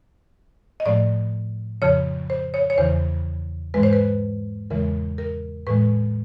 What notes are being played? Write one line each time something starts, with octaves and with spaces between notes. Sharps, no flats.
D#5
A2 F3 A3 D5
F2 C#3 F3 C#5
C5
C#5
C#5
E2 C#3 E3 C5
G#2 E3 G#3 B4
C5
B4
E2 C#3 E3 G#3 A#4
A#4
A2 E3 G#3 B4